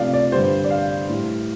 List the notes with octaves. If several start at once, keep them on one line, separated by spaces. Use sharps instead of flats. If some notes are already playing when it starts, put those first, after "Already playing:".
Already playing: C3 F3 A3 D5 F5
D5
G2 D3 G3 C5
D5
F5
A2 G3